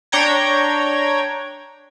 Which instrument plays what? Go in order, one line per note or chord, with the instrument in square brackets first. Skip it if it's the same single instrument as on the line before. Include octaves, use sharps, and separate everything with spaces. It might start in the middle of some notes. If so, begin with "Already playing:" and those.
[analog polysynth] D4 C#5 G5 A#5 G#6